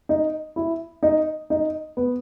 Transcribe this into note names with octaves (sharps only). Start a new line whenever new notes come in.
D#4
E4
D#4
D#4
B3